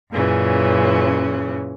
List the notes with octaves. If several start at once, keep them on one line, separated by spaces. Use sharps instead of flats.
F#2 A#2 C#3 E3 C#4